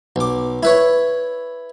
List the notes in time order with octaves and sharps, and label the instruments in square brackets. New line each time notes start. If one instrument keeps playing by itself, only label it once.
[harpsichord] B1 D6
E4 B4 C#5